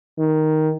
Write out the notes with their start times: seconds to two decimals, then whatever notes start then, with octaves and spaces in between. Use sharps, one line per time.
0.19 D#3